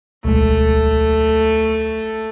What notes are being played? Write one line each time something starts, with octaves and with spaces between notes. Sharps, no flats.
D1 B1 G#3 A3